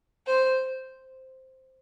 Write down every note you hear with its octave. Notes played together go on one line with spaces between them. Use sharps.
C5